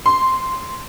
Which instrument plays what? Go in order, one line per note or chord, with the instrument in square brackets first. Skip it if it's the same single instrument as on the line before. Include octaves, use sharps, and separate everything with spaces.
[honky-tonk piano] C6